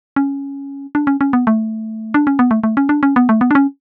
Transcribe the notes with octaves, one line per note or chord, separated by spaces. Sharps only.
C#4
D4
C#4
C#4
B3
A3
D4
C#4
B3
A3
A3
C#4
D4
C#4
B3
A3
B3
D4
C#4